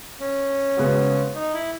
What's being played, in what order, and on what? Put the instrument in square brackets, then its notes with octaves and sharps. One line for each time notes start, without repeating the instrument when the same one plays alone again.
[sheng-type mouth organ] C#4
[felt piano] C#3 G#3 B3 F#4
[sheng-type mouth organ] D#4
E4